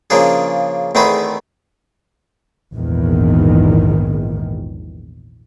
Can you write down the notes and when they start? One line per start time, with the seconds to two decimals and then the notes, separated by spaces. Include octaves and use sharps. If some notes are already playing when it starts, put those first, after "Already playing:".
0.10 C#3 F3 A#3 D4 G#4
0.95 E2 D#3 A3 C4 G#4 B5
2.74 A#1 E2 G#2 D#3